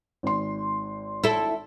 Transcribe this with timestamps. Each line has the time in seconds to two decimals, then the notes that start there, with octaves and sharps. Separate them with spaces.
0.23 G#1 C6
1.24 E4 A4